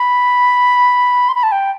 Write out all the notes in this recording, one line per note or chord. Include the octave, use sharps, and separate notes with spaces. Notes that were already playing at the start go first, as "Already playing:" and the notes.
Already playing: B5
C6
B5
A5
G5